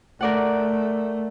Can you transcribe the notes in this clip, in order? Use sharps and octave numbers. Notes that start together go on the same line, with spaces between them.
A3 A#4 D5 F#5